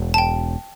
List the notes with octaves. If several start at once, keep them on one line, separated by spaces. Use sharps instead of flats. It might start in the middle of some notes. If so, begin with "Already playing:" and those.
Already playing: E1
A5
G5